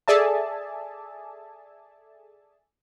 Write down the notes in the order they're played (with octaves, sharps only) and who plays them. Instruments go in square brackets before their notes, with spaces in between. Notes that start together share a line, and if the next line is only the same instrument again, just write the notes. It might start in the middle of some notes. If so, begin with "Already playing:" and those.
[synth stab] G#4 A4 D5 E5 G#5 A5